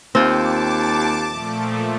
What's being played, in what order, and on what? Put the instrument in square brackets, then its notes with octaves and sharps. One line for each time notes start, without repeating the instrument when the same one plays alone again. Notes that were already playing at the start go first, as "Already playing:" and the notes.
[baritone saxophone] D#2 [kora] C4 F4 [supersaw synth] A5 D6
[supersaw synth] A#2 F3 A3